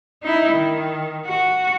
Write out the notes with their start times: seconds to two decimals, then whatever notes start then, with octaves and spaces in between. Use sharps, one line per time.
0.23 D#4 E4
0.52 D#3
1.27 F#4